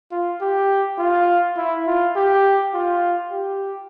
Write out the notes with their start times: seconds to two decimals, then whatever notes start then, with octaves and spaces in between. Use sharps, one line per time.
0.11 F4
0.41 G4
0.98 F4
1.57 E4
1.87 F4
2.16 G4
2.73 F4
3.31 G4